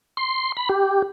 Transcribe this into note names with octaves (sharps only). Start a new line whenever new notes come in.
C6
B5
G4